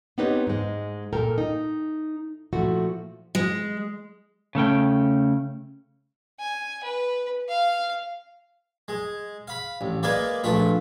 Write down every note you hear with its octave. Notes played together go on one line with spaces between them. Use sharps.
B3 C4 D#4 G4 B4 C#5
G#2 G#3
A#2 A4 A#4 G5
D#4
A#2 F3 A3 E4 F#4
G#3
C#3 A3 C#4 G5
G#5
B4
F5
G#3
F5 B5
A1
G#3 A#3 B4 D5 F5 G#5
A#1 A3 F4 B4